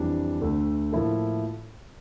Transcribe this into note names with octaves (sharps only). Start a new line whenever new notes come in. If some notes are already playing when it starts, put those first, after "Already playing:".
Already playing: F2 E3 G3 D4
D2 D3 A3
A2 F3 A#3 E4 A4